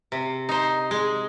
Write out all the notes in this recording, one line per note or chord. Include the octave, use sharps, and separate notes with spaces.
C3
D#4 C5
G#3